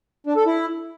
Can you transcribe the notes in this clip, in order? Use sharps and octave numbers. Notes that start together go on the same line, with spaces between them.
D4
A4
E4